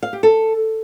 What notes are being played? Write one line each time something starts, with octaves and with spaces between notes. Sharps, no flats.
F5
G4
A4